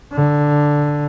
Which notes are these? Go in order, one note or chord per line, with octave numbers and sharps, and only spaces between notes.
D3